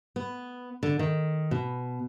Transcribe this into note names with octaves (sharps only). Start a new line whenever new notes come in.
B3
D3
D#3
B2